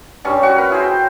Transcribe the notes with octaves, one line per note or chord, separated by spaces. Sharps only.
G2 G3 C#4 C#6
F#4 C#6
A#4 B4
E4 G#4 C5
G5